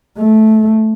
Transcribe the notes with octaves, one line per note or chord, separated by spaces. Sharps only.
A3